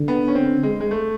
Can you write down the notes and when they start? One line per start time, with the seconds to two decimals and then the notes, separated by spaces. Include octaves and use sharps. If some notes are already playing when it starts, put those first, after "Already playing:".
Already playing: D3
0.08 B3
0.28 C#4
0.35 C4
0.63 G#3
0.81 G#3
0.91 A3